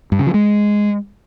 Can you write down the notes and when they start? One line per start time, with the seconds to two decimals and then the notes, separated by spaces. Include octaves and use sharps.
0.12 G2
0.19 C#3
0.27 F3
0.34 G#3